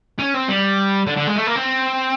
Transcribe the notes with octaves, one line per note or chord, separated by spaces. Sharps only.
C#4
C4
G3
D3
D3
G#3
A3
A#3
C4